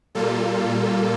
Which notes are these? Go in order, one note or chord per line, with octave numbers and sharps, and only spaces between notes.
A#2 G3 A#3 F4 A4